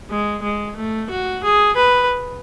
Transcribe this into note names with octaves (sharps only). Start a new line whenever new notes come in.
G#3
G#3
A3
F#4
G#4
B4